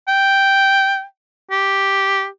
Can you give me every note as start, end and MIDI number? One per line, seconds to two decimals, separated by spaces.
0.08 1.03 79
1.51 2.27 67